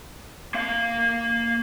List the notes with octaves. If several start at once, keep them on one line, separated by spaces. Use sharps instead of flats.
A#3 F5